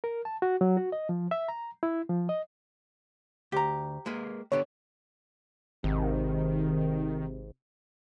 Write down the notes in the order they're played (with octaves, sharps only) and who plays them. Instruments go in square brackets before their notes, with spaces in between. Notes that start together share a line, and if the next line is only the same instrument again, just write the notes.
[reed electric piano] A#4
A5
F#4
F#3
F#4
D#5
F3
E5
A#5
E4
F3
D#5
[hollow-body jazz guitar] D2 [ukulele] G4 A#5
[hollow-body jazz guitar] G#3 A#3 B4
[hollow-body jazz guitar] D3 B3 G4 [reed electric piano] C#5
[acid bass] G#1 [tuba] C3 [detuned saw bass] D#3